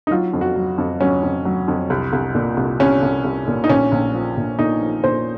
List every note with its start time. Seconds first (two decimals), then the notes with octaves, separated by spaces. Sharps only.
0.07 D#4
0.11 F#3 F4
0.33 F2
0.41 F#4
0.56 F#3
0.78 F2
1.00 F#3 C#4
1.23 F2
1.45 F#3
1.68 F2
1.90 C2
2.13 C2
2.35 A#2
2.57 C2
2.80 C2 C#4
3.03 C2
3.24 C2
3.48 A#2
3.64 D#4
3.69 A#1 C#4
3.92 A#1
4.14 F3
4.37 A#1
4.59 A#2 D#4
4.82 F3
5.04 A#2 C5